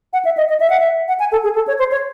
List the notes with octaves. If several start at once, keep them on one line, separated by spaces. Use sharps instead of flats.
F#5
E5
D#5
D#5
E5
F#5
E5
F#5
G#5
A4
G#4
A4
C#5
C5
C#5